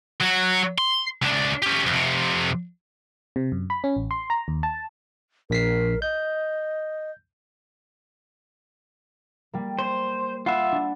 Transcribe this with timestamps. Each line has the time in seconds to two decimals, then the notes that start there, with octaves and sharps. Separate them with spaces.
0.20 F#3 F#4
0.78 C6
1.22 C#2 D4
1.63 C#4 G4
1.87 F2 C3
3.36 C3
3.52 F#2
3.70 B5
3.84 C#4
3.97 A1
4.11 C6
4.30 A#5
4.48 D#2
4.63 A5
5.50 A#1 A#4 B6 C7
6.02 D#5 G6
9.53 G3 A#3
9.79 C5
10.46 F4 E5 F#5 B5 D#6
10.72 D4